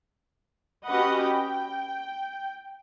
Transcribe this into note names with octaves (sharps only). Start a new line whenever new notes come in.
C#4 F#4 G4 B4 D#5 F#5
G5